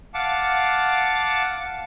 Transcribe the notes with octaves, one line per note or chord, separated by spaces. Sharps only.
F5 F#5 A5 D6